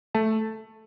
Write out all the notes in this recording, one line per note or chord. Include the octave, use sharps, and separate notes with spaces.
A3 A5